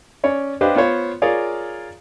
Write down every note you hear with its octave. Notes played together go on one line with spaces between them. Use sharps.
C#4 C#5 D5
D4 G4 B4 C5 D#5 F5
B3 F4 C5 C#5
F4 G#4 A#4 C#5 D5 F5